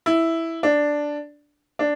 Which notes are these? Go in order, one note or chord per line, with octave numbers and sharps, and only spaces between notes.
E4
D4
D4